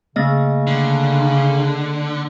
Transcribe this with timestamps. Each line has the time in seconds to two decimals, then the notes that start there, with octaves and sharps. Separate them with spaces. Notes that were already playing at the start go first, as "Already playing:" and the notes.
0.16 C#3 A3 A#3 D#5
0.67 D3